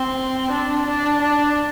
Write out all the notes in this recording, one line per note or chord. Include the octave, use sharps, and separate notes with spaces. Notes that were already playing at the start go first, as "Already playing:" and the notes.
Already playing: C4
D4
D4
D4